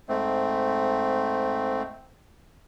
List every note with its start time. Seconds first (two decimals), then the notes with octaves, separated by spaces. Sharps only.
0.09 G#2 A3 C4